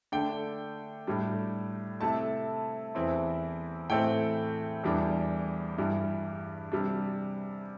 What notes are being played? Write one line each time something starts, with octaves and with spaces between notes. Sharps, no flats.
D3 A3 D4 G5
A2 G3 D4
C3 A3 E4 A5
E2 E3 C4 E4
A2 E3 A3 C4 G5
E2 E3 G3 D4
G2 E3 G3
C3 G3 D4